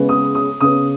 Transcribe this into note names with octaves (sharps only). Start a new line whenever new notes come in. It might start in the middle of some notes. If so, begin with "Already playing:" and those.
Already playing: C#3 G#3 B3
D#6
D#6
C#3 B3 D#6